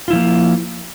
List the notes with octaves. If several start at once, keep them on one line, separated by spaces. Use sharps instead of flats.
F3 A#3 E4 F4